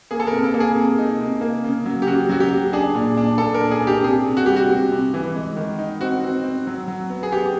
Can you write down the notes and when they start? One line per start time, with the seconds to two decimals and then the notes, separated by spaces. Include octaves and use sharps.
0.11 A#3 G#4
0.20 A4
0.27 A#4
0.32 C3
0.39 A#4
0.44 A4
0.54 A#3
0.60 G#4
0.76 C3
0.98 D#4
1.20 C3
1.41 A#3
1.64 C#3
1.85 F#3
2.02 G4
2.07 C#3 F#4
2.29 F#3 F#4
2.40 G4
2.51 C#3
2.73 D4 G#4
2.95 A#2
3.17 D4
3.38 A#2 A4
3.54 A#4
3.61 D4
3.71 G#4
3.82 D4
3.87 G4
4.04 C3 G#4
4.26 C3
4.37 F#4
4.46 G3 G4
4.56 F#4
4.69 C3
4.92 C3
5.14 E3
5.36 G#3
5.57 D#3
5.79 D#4
6.01 C4 F#4
6.23 C4
6.44 C4
6.67 F#3
6.88 F#3
7.10 B3
7.23 G#4
7.32 B3 G4